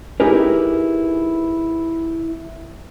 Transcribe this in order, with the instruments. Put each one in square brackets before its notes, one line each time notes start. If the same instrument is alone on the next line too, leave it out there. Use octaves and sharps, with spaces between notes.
[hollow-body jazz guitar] D#4 E4 G4 G#4 A#4 B4